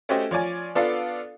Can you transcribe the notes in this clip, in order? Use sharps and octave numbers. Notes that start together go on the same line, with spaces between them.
A3 C#4 F#4 G4 C5 D#5
F3 C#5 D5 G#5
B3 D4 F4 A4 D5 F5